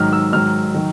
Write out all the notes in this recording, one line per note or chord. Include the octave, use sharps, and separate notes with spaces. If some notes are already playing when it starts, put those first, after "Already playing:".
Already playing: G#2 D#3 F#3 F6
E6
G#2 D#3 F#3 F6
D#3 F#3